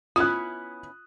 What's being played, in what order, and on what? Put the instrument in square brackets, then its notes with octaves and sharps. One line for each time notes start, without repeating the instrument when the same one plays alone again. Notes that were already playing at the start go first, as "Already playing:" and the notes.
[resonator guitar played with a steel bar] B3 C#4 E4 [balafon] F4 [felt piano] D#6 F#6